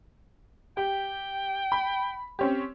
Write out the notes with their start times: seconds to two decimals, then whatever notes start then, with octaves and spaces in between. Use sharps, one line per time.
0.77 G4 G5
1.72 B5
2.39 C4 C#4 G4